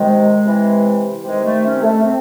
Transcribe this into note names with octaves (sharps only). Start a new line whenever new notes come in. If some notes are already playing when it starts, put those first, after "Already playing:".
Already playing: C3 D#3 G#3
C3 E3
C3 D#3 G#3
A3
C#4
C4
A3
C3 C4